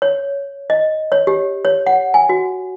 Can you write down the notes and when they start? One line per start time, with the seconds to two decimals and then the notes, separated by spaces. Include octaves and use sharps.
0.02 C#5
0.70 D#5
1.12 C#5
1.27 G4
1.65 C#5
1.87 F#5
2.14 G#5
2.29 F#4